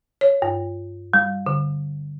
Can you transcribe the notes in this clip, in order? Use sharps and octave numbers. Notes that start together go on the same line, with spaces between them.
C#5
G2
G3
D3